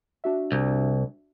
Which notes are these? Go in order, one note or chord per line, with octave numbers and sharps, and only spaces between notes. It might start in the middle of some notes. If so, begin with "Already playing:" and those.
D4 F#4 E5
C2